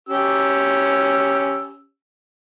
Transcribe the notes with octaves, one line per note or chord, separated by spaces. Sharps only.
C#4 G4 E6